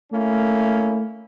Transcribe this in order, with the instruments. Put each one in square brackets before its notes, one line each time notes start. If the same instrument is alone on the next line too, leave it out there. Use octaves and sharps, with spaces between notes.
[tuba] A3 [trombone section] A#3 C#4 E4